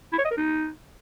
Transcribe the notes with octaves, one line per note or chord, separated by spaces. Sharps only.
E4
C#5
D#5
A#4
D#4